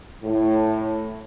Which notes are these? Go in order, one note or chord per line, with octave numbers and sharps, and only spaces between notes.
A2